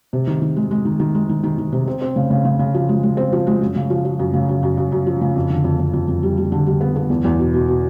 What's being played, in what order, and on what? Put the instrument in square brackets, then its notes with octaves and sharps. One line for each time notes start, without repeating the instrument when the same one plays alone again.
[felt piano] C3
D#3
D#3
G#3
G#3
D#3
D#3
G#3
D#3
D#3
D#3
C3
C4
C4
C#3
C#3
C#3
C#3
F3
G#3
G#3
C4
F3
G#3
F#2
C#3
F3
F3
F#2
C#3
F#2
F#2
F#2
F#2
F3
C#3
F2
D3
F2
F2
F2
F2
G3
G3
D3
G3
B3
B3
E2
E2
B2
B2
B2